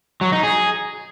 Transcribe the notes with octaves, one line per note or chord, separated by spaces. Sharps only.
F#3
D#4
G#4